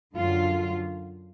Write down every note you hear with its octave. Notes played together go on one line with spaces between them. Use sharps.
F#2 D3 F#3 F4